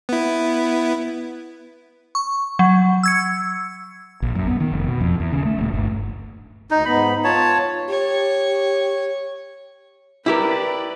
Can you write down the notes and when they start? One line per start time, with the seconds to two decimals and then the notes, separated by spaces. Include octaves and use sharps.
0.09 B3 E4
2.15 C#6
2.59 F#3
3.03 E6 G#6 C#7
4.22 A#1
4.35 F#2
4.47 B3
4.60 D#3
4.73 F1
4.87 B2
5.01 F2
5.20 E2
5.32 C#3
5.45 A3
5.59 D#1
5.73 G1
6.71 D2 D#4
6.85 G#2 B3 D#4 B5
7.24 F4 C#5 A5
7.90 G4 C#5
10.26 E4 G4 A#4 B4 D5